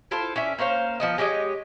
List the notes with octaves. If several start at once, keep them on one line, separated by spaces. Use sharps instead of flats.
E4 F4 A4 C5
C#4 D4 E5
A#3 C#4 C5 F5
F3 B3 D#5
G#3 G4 C#5 D#5